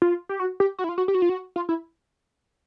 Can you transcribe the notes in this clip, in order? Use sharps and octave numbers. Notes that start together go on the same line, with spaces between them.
F4
G4
F#4
G4
F#4
E4
F4
F#4
G4
F#4
F4
F#4
F4
E4